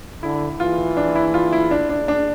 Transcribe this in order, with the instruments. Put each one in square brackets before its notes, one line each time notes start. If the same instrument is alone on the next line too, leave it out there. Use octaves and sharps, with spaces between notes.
[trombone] D3 [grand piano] E4
[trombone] E3 [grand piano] F4
[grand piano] D4
E4
F4
E4
D4
D4
D4